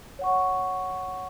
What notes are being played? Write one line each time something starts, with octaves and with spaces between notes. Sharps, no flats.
C#5 F#5 C#6